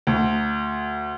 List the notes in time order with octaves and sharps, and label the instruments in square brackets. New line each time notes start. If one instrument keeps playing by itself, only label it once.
[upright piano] D2